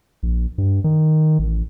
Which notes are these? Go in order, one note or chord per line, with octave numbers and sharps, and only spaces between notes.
A#1
G2
D#3
A1